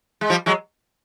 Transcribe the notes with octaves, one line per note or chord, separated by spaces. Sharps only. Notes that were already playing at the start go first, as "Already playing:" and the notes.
G#3
F3 G3
F#3 G#3